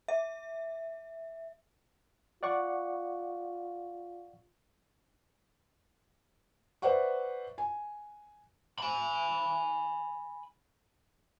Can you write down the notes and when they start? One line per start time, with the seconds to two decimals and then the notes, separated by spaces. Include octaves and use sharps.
0.08 E5
2.43 F4 D5 F#5 C#6
6.82 B4 C5 D5 E5 F#5 C#6
7.58 G#5
8.78 G#5 B5